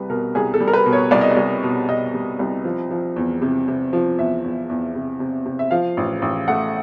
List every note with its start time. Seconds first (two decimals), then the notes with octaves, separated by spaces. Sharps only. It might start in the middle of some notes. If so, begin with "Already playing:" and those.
Already playing: C2 G3 B4
0.10 B2 A#4
0.35 C2 G#4
0.54 A4
0.60 G3
0.68 A#4
0.73 B4
0.86 B2
0.93 C#5
1.11 C2 D5
1.21 D#5
1.31 D5
1.37 C2
1.63 B2
1.89 B2 D#5
2.14 G3
2.39 C2
2.64 F3
2.91 F3
3.16 E2
3.42 C3
3.68 C3
3.93 F3
4.18 E2 E5
4.44 E2
4.69 E2
4.95 C3
5.20 C3
5.46 C3
5.59 E5
5.71 F3 F5
5.97 A1
6.22 A1
6.48 A3 F#5